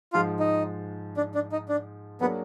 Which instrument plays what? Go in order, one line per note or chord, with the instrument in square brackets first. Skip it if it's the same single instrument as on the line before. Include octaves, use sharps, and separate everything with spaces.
[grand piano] G#2 F3 G#3 [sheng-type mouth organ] F4
[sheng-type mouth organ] D#4
D4
D4
D#4
D4
[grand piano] F#3 A#3 D4 G#4 [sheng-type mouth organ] B3